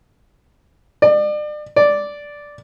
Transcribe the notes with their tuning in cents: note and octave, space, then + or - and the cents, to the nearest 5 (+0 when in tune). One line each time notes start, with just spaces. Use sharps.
D5 +35
D5 -5